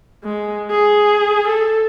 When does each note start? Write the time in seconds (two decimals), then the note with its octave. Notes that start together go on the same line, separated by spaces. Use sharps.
0.24 G#3
0.71 G#4
1.48 A4